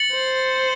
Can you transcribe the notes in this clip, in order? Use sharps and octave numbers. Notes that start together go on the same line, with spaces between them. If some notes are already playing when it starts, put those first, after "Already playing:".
Already playing: A6 C#7 F#7
C5